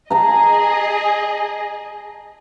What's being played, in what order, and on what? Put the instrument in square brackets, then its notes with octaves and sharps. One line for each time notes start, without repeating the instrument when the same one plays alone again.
[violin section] G#4 D#5 [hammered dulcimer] A5 A#5